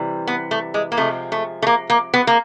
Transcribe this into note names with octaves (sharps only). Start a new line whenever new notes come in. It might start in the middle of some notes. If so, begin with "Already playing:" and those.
Already playing: C3 E3 G3
B3
A3
G#3
A#3
C3 F3 G#3 A3
A3
A3
A#3
A#3
B3
A#3